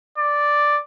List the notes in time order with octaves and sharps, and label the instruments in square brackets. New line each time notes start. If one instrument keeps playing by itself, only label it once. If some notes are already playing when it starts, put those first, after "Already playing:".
[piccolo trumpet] D5